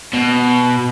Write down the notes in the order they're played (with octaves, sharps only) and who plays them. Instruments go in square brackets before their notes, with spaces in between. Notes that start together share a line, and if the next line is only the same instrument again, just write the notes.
[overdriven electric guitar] B2